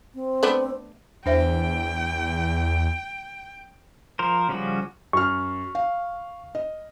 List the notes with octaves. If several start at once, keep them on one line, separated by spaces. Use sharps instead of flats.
C4
A3 B3 D4
E2 D4 C5 E5 G5
F3 A#4 C5
C#3 F3 G3 C#4 F#4
F#2 C#6 F6
F5
D#5